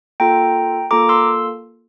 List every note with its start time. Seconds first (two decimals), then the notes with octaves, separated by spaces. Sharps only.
0.20 A#3 F4 A4 G5 A#5
0.91 A#3 F4 A4 A#5 D6
1.09 C6 E6